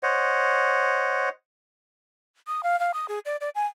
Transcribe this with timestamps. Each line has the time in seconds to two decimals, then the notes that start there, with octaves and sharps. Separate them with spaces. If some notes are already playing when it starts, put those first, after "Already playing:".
0.03 C5 C#5 D#5 F#5
2.47 D#6
2.63 F5
2.80 F5
2.94 D#6
3.08 G#4
3.25 D5
3.41 D5
3.55 G#5